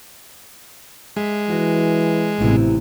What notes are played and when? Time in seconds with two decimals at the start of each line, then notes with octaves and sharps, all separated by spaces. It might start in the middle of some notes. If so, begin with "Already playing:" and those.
1.16 G#3 E5
1.50 E3 F#4
2.40 A1 C3 B3 E4 B4